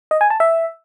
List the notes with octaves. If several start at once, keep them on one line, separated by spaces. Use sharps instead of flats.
D#5
G#5
A5
E5